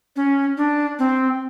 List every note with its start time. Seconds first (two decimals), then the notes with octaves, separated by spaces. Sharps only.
0.16 C#4
0.57 D4
0.99 C4